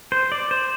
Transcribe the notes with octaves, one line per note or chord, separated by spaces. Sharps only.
C5
D5
C5